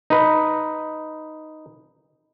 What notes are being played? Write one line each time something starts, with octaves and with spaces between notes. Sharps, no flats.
D#4 B4